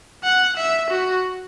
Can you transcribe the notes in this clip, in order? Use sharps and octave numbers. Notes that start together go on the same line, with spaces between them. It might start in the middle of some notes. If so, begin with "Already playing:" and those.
F#5
E5
F#4